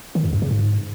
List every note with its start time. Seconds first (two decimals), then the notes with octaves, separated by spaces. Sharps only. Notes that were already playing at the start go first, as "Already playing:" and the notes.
0.15 D#3
0.24 F2
0.33 G2
0.42 C#3
0.51 G#2